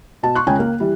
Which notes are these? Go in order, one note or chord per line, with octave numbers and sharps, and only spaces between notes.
B2 A5
C6 C#6 F#6
C#2 C#3 C#5 G5 G#5
A#3
E3 G3